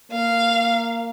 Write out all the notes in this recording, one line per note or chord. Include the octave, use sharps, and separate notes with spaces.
A#3 F5